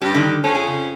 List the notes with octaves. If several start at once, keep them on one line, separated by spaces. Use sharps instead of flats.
G2 C#4 G4
D3 D#3
F2 C#4 A4
G#4
C#3